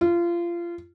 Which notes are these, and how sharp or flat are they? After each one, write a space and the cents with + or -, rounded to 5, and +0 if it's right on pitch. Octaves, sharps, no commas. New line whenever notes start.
F4 -25